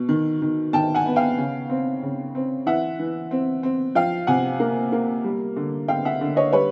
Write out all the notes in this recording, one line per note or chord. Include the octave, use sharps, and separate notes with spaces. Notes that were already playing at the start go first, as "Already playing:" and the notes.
Already playing: B2
D#3
D#3
D#3 G5 A5
F#5 G#5
B3
F5 G5
C#3
C4
C#3
C4
E3 E5 F#5
E3
C4
C4
F3 F5 G5
C3 F#5 G#5
A#3
A#3
G3
D3
D3 F5 G5
E5 F#5
D3
C#5 D#5
G3 B4 C#5